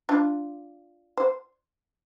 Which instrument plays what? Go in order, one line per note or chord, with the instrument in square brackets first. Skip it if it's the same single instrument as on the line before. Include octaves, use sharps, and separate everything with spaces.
[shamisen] D4 F4
C5